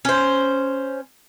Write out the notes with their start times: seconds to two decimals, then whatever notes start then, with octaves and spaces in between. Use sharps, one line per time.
0.05 C#4 C5